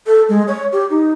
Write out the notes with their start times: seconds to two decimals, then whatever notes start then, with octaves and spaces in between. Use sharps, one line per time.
0.07 A4
0.29 G#3
0.48 C#5
0.73 G4
0.90 D#4